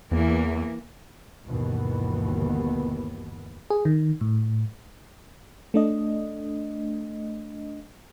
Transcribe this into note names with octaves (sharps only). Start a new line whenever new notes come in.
E2 E3 A#3
G1 D#2 B2 E3 B3
G#4
D#3
A2
A3 D4 D#5